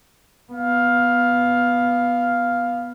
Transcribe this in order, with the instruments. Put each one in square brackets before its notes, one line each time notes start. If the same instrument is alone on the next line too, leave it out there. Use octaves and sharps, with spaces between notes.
[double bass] B3 [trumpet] F5